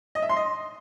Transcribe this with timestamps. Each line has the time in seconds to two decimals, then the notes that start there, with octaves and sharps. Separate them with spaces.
0.15 D#5
0.22 E5
0.29 C6
0.36 D#5